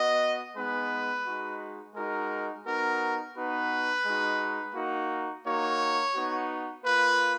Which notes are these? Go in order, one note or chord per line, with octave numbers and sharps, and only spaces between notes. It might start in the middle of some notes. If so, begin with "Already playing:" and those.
Already playing: B3 F#4 D#5
G#3 B3 D#4 B4
G#3 D#4 F#4
G#3 D#4 F#4 A#4
B3 D#4 F#4 A#4
B3 D#4 F#4 B4
G#3 D#4 F#4
A#3 D#4 F#4
A#3 D#4 F#4 C#5
B3 D#4 F#4
A#3 F4 B4